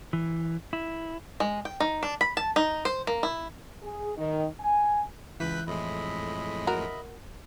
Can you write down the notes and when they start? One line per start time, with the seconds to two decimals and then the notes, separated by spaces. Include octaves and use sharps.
0.13 E3
0.73 E4
1.40 G#3
1.65 G5
1.80 D#4
2.03 D4
2.21 B5
2.37 A5
2.56 D#4
2.85 C5
3.07 A#3
3.23 E4
3.82 G#4
4.17 D#3
4.60 G#5
5.40 C#2 E3 B4 E5 F#6 G6 B6
5.67 F2 A2 G#3 D#5 E5 B5
6.67 F#4 A#4